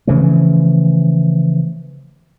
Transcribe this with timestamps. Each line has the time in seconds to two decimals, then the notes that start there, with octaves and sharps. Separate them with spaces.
0.07 C#3 E3 F3 A3